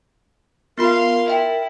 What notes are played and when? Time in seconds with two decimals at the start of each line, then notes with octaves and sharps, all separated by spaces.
0.78 B3 F4 A#4 F5 B5 C6
1.28 E4 E5 G5